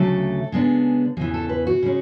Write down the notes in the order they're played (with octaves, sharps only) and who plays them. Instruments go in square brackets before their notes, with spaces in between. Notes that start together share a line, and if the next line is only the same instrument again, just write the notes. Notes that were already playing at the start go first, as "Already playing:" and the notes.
Already playing: [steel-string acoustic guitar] D2 C#3 F#3 A3 A4
C#3 G#3 B3 D4
E2 C#3 E3 G#4
A4
B4
F#4
C#3 G#3 C#4